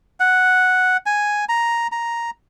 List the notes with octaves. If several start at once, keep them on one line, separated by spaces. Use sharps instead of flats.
F#5
G#5
A#5
A#5